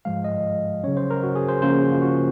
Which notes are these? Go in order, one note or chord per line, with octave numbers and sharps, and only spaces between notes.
G#2 F3 G#3 F5
D#5
C#3 F#3 C#4 C#5
C5
A#4
F#4
G#4
C5
C#3 F3 A#3 C#4 C5
A#4
F#4
F4
F#4